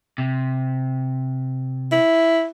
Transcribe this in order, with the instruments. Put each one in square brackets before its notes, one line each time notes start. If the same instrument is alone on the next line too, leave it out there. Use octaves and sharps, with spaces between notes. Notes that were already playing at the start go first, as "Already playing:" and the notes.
[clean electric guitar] C3
[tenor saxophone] E4